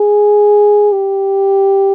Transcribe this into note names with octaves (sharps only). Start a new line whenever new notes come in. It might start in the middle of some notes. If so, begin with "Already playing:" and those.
Already playing: G#4
G4